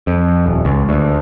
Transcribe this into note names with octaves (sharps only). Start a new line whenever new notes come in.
F2
D#1
C#2
D2